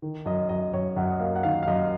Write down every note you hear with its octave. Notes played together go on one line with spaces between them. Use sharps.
D#3
F#2 D#5
F#2 D#5
F#2 C#5
F#2 F#5
D#5
A#3 F5
F#5
D#3 F5
F5
F#2 D#5